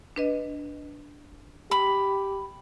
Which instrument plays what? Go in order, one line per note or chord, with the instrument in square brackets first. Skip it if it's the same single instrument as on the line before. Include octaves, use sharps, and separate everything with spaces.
[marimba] D4 B4 D#5
[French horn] G4 [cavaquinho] B5